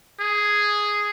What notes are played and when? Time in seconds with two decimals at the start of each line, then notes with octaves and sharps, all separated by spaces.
0.20 G#4